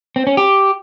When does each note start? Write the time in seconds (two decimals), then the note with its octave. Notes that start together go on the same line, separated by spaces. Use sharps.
0.16 C4
0.27 C#4
0.37 G4